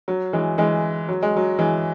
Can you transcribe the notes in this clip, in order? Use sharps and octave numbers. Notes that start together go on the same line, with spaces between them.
F#3
E3 G#3
E3 G#3
F#3
G#3
F#3
E3 G#3